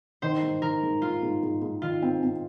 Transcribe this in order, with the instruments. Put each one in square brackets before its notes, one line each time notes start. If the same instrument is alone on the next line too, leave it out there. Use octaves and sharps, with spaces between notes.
[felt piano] D#3 [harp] C5
[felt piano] G#2
[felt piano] D#3 [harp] A#4
[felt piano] G#2
[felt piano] G#2 [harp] F4
[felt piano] G#2
G#2
G#2
[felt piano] D#3 [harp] F4
[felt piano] C4
C4